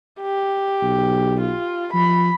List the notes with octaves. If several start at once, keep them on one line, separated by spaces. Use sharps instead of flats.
G4
B1
F4
F3 B5